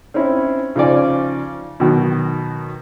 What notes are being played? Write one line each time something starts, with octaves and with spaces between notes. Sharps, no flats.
C4 C#4 D#4 E4
C#3 F3 D#4 C5 D5 G#5
B2 D#3 F#3